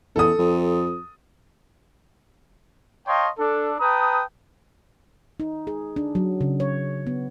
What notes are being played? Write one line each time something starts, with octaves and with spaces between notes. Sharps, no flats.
E2 A4 D#6
F2
C#5 D#5 F5 G5 A5 C6
D4 A4
B4 G5 A5 A#5 D#6
D#4
G#4
D4
F#3
C#3
C#5
B3